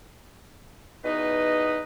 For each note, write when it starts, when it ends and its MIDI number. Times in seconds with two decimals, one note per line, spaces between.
1.04 1.83 40
1.04 1.83 47
1.04 1.83 63
1.04 1.83 71
1.04 1.83 75